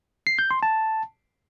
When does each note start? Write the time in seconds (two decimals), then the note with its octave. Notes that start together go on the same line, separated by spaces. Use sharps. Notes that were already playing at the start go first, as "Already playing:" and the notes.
0.27 C7
0.39 G6
0.51 C6
0.63 A5